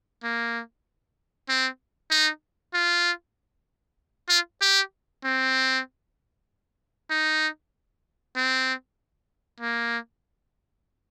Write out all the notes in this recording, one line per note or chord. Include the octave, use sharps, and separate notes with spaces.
A#3
C4
D#4
F4
F4
G4
C4
D#4
C4
A#3